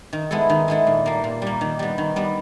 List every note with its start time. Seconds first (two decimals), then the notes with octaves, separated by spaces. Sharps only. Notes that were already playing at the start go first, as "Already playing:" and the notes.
0.13 D#3
0.31 G#3 B3 E4 A4
0.49 D#3
0.68 G#3 B3 E4 A4
0.87 A#2
1.06 G3 A#3
1.24 A#2
1.42 G3 A#3
1.61 D#3
1.79 G3 B3
1.98 D#3
2.16 G3 B3